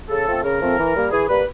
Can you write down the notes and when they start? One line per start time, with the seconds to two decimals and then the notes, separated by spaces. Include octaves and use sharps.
0.10 C#3 A4
0.28 F3 A3 C4
0.44 C#3 A#4
0.61 F3 A3 C4
0.79 E3
0.95 G3 A#3
1.12 E3 G#4
1.29 G3 A#3 B4